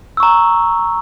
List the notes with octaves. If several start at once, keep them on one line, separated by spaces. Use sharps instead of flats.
A#5 C#6 E6